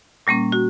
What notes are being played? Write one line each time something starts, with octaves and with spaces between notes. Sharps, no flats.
A#2 G3 A#3 C#4
F#4